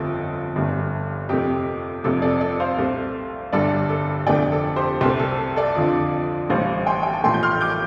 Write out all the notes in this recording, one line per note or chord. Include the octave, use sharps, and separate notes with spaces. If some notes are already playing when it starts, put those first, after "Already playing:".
Already playing: G1 F2 F3 A3 A4
G1 G2 D3 A3
F2 C3 A3 G4
F1 F2 C3 A3 A4
A4 D5
A4 D5
C5 F5
C2 C3 A3
G1 G2 D3 G3 A4 D5
A4
F1 F2 D3 A3 D5 G5
A4
G4 C5
C2 C3 A3 G4 C5
A4
A4
A4 D5
F2 D3 F3
A1 A2 G3 C5 F5
G5 C6
G5
A5
A1 A2 F3 A3 G5 C6
G6
C6 F6
D6 G6